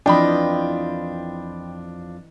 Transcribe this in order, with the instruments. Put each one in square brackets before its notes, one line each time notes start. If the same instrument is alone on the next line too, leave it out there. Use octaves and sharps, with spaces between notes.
[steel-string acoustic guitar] F2 F4 [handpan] E3 D#5 [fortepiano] D4 [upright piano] G5 B5